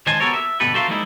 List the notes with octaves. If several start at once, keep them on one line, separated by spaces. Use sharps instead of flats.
C#2 D#3 C5 D#5 G#5 A5
B3 F#4 G4 A4 A#4 C#5
E5
G2 B2 D3 G4 A4 B4
F#4 A4 A#4 C5 E5 F5
F3 G3 G#3 A#3 D#4 E4